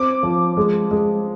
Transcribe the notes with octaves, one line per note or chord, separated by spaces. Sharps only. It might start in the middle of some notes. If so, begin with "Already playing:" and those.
Already playing: C4 D6
F3
G#3
G#3